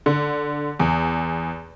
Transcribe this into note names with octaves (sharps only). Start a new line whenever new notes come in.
D3
E2